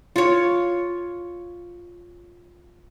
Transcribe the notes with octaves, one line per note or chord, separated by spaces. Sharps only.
F4 C#5